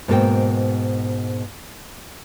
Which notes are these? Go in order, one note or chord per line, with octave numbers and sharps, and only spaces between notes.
G#2 B2 A#3 A4 C5 G5